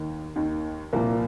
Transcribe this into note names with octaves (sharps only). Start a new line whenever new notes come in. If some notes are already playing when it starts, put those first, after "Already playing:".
Already playing: D#2 D#3
D#2 D#3
C2 A#2 F3 A#3